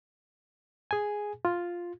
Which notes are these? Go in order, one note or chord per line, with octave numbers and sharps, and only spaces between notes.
G#4 G#5
F4